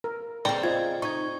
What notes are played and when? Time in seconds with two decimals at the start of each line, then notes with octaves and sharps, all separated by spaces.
0.04 A#4
0.45 C#3 C4 A4 D5 G5 A#5
0.64 F4 C5 D#5 G#6
1.02 D#4 C#6 G#6